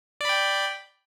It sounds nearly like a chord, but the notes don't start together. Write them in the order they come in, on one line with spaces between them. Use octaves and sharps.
D5 B5 G5